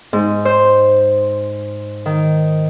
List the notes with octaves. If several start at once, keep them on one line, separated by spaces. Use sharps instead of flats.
G#2
C5
D#3